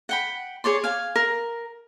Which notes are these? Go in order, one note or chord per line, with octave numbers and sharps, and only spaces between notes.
F#5 G5 B5
G#4 C#5 D5 C6
F5 G#5
A#4